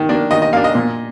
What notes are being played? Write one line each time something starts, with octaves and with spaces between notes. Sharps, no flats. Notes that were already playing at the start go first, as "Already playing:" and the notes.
Already playing: D#3
A#3 D4
D#3 D#5
D#5
A#3 D4 F5
D#5
A#2